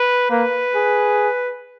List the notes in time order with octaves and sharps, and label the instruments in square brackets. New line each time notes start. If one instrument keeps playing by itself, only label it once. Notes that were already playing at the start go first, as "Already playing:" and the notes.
Already playing: [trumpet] B4
[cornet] A#3 [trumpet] B4
[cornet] G#4